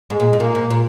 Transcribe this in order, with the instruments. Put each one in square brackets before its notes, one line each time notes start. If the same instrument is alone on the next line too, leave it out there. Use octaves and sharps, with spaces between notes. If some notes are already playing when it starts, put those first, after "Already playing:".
[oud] G#2 [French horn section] G#3
[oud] A#2
G#2
[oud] A#2 [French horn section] A#3
[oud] G#2
A#2